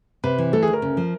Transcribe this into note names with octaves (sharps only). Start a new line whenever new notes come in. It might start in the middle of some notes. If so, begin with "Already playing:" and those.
C3 B4
E3
A3 A4
G#4
D2
A#4
C#3
F3